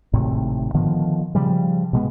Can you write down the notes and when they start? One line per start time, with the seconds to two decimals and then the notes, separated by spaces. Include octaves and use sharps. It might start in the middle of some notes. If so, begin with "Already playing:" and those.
0.13 G#1 A2 C3
0.74 D3 D#3 F3 B3
1.35 C#3 F3 G3
1.93 B2 G#3 B3